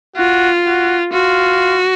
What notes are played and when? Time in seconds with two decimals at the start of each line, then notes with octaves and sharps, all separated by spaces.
0.16 F4 F#4
0.65 F#4
1.12 F4 F#4